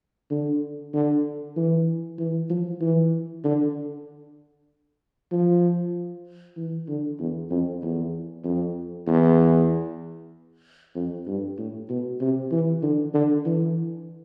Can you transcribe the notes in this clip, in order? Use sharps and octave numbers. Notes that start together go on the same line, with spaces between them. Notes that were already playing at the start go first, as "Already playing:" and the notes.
D3
D3
E3
E3
F3
E3
D3
F3
E3
D3
E2
F2
E2
F2
E2
F2
G2
A2
B2
C3
E3
D3
D3
E3